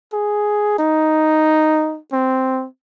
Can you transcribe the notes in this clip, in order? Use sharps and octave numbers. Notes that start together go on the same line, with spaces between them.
G#4
D#4
C4